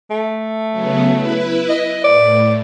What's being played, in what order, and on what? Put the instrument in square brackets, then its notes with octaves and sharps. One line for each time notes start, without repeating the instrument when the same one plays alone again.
[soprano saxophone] A3
[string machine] C#3 F#3 B3
E4 B4
[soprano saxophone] D#5
[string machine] A2 [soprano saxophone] D5